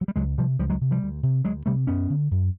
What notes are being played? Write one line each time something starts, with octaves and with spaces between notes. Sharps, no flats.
F#3
G3
C#2 F#3 G#3
C3 F3 G3
C#2 F3 G3
F#3 G#3
C3
F3 G3
D2
C3
D2 F#3 G#3
C3 G3 A3
F#2 B3 C#4
D3
F#2